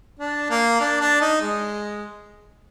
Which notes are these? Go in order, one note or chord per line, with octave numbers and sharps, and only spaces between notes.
D4
A#3
D4
D4
D#4
G#3